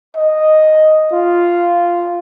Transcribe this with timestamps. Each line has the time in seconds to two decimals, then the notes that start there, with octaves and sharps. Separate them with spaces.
0.16 D#5
1.12 F4